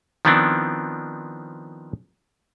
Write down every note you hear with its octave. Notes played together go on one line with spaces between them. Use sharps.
D#3 F3 B3 C4 D4 E4